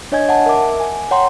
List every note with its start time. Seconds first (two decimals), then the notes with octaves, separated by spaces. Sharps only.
0.12 D4 C#5 D#5 G#5 G#6
0.29 F#5 A5
0.46 A#4 E5 D6
0.80 G#5
1.11 C#5 F#5 G5 A#5 C6